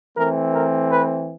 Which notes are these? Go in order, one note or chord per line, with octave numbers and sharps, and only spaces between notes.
E3 A3 C4 A#4
A#4
B4